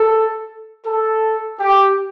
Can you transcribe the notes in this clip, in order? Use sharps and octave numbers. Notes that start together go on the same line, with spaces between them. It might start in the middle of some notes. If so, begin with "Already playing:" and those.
Already playing: A4
A4
G4